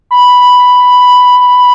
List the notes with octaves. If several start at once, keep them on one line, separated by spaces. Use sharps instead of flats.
B5